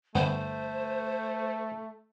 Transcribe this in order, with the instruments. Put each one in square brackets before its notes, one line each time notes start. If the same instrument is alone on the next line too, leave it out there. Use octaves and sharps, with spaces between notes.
[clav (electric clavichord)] G1 B3 [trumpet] A3 [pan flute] C5